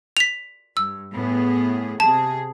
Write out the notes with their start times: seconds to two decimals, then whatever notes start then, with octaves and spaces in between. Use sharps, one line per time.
0.17 B6 F7
0.77 G2 E6
1.13 A2 B3 G#4
2.00 C3 G#4 A5